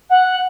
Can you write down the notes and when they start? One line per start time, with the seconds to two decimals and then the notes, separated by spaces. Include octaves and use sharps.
0.09 F#5